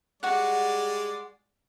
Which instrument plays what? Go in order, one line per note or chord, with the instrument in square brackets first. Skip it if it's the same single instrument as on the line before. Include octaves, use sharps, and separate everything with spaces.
[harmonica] G3 G#3 D5 [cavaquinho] F#4 F#5